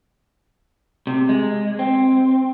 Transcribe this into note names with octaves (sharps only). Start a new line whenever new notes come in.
C3
G#3
C4